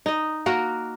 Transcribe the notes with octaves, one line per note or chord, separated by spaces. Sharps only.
D#4 D#5
A#3 F#4 A#4